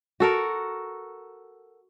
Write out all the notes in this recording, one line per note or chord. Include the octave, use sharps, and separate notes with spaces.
F#4 A4 A#4